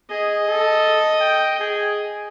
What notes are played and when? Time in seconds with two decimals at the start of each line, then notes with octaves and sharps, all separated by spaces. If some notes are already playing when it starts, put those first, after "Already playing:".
0.10 G#4 D#5
0.48 A4
1.20 G5
1.60 G#4